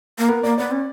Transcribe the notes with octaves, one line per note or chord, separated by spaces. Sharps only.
A#3
B3 A#4
A#3 D5
B3 D5
C#4